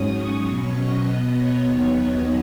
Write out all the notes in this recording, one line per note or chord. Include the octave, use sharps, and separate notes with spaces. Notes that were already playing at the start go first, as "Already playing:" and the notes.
Already playing: G#2 F#3 C#4 D#6
C#6
B2 F#3 C#4 C#6
D#5
B2 B3
C#5
D#2 D#3 F#3 B3
D#5